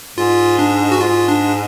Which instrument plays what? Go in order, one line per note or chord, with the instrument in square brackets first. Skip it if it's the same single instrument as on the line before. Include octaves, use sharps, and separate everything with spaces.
[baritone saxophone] G#2 [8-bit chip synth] F4
[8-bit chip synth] D4
F#4
[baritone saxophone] G#2 [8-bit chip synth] F4
[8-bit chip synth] D4